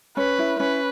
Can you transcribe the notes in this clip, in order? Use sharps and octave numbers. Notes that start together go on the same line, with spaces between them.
C#4 B4
E4
C#4 B4